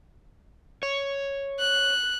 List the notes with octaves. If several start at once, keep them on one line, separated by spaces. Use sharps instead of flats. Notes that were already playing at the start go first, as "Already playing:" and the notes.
C#5
F#6